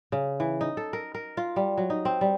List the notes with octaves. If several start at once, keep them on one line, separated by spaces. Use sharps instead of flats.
C#3
E3
D#4
A4
A#4
A#4
F4
G3
F#3
D#4
C4
G3